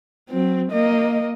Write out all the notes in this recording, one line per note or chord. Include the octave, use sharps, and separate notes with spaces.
F#3 C4
A#3 D#5